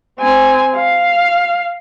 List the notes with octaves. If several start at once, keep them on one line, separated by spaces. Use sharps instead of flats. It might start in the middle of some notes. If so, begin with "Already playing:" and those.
C4 G#5
F5